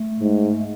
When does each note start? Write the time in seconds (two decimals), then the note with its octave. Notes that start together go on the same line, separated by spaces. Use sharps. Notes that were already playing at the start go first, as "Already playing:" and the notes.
Already playing: A3
0.20 G#2